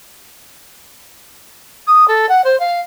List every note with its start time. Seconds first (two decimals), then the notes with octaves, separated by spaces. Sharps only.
1.87 D#6
2.08 A4
2.29 F#5
2.44 C5
2.60 F5